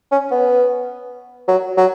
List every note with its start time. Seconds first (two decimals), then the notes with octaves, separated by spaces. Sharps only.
0.12 C#4
0.31 B3
1.48 F#3
1.77 F#3